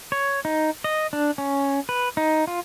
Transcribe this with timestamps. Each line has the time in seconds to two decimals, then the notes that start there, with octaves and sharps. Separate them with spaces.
0.12 C#5
0.45 D#4
0.84 D#5
1.13 D4
1.38 C#4
1.89 B4
2.17 D#4
2.47 F4